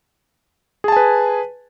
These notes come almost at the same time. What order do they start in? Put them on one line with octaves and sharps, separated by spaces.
G#4 A5 G#5 B4